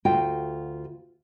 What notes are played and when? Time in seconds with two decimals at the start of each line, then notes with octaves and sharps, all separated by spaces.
0.05 D2 F4 F#4 G5